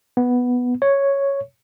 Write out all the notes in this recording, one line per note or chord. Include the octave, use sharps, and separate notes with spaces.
B3
C#5